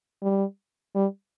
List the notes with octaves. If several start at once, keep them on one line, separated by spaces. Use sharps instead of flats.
G3
G3